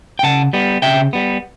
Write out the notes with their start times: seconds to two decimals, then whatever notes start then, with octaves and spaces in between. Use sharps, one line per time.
0.19 G5
0.23 C#3 F#5 A5
0.53 G3 B3
0.82 C#3 E5 G5
1.13 G3 B3